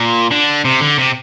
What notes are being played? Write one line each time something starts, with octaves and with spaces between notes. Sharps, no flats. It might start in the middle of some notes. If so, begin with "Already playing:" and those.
Already playing: A#2
D3
C3
D3
C3